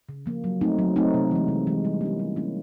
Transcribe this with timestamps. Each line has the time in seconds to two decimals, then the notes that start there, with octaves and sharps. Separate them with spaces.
0.09 C#3
0.26 F3 A#3
0.44 F#3
0.61 A3 C4 D#4
0.79 F#3
0.96 A3 C4 D#4
1.14 C3
1.31 E3 G#3
1.48 C3
1.67 E3 G#3
1.84 G3
2.01 A#3 C#4 E4
2.20 G3
2.36 A#3 C#4 E4